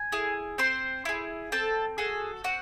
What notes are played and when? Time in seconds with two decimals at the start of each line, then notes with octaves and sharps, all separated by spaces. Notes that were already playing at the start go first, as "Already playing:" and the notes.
Already playing: G#5
0.12 E4 G#4
0.58 C4 C5 C6
1.05 E4 G#4
1.52 C4 A4 A5
1.98 F#4 G#4 A4 G#5
2.44 C4 F#4 F#5